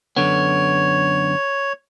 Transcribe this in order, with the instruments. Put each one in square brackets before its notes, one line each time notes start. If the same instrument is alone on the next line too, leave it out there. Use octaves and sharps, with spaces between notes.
[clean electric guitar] F#2 D3 B3 [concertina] C#5